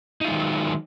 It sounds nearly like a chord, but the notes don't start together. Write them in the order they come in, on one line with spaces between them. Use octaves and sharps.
D#4 F4 G#3 D#3 F#3